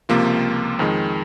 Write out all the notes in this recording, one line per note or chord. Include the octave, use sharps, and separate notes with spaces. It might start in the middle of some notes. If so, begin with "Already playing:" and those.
C#2 C3 F3 A#3 F4
F2 D#3 G#3